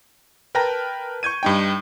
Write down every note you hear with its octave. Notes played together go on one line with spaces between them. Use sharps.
A#4 B4 G5 A5 A#5 A#6
C#6 G6 G#6 D#7
G2 D#4 G5